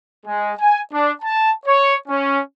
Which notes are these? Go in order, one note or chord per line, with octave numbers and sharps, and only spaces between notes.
G#3
G#5
D4
A5
C#5
C#4